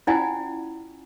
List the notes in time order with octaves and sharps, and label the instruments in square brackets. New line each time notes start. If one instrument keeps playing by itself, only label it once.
[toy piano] C#4 E4 F4 D5 F#5 G#5